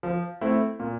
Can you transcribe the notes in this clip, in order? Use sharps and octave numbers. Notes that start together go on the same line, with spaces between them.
F3
A3 C4 E4
A#2